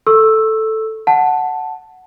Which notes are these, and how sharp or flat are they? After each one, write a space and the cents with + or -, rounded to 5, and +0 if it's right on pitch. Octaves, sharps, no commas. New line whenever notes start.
A4 +0 C#6 -30 E6 +0
F#5 +0 A5 +0